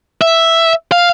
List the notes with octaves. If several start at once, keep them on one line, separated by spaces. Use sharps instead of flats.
E5
F5